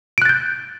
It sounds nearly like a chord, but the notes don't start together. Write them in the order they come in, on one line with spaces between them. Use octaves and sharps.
D7 F#6 A6 G6